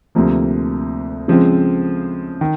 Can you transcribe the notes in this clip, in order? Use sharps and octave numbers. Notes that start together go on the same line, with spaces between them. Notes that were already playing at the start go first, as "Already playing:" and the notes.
D2 C3 F3 A#3
C#3 F3 G#3 C4
D#3